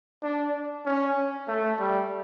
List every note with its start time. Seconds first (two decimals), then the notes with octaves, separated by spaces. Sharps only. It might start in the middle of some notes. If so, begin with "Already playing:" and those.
0.22 D4
0.86 C#4
1.48 A3
1.79 G3